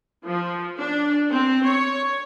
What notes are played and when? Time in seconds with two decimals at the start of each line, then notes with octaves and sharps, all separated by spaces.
0.24 F3
0.78 D4
1.29 C4
1.64 C#5